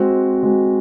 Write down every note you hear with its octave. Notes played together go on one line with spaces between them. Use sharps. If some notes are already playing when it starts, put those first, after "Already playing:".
Already playing: G#3 C4 F#4
G#3 C4 F#4